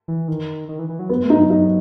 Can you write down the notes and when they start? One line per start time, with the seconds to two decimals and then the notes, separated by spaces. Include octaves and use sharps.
0.08 E3
0.28 D#3
0.69 D#3
0.79 E3
0.89 E3
0.99 F#3
1.09 B3
1.23 A3
1.30 D#4
1.37 F#3
1.50 D#4